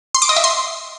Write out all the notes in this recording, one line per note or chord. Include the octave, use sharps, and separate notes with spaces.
C6
D6
D#5
E5
C6